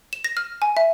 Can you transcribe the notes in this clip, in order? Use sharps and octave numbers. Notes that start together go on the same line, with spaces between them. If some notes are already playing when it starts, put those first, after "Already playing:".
E7
A#6
F6
G#5
E5